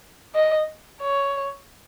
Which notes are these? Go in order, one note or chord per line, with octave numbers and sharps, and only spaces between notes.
D#5
C#5